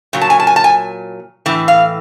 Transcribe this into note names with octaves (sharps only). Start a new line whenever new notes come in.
A#2 F#3
A5
G#5
A5
G#5
A5
G#5
A2 E3
F5